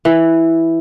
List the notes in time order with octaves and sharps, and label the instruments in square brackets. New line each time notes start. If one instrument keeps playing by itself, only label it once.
[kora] E3